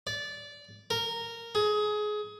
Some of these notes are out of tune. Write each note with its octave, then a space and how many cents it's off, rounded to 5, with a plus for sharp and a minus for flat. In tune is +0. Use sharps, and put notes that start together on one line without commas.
D5 -20
A#4 -10
G#4 +20